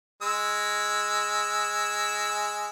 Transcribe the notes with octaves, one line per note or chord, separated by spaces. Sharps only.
G#3 E6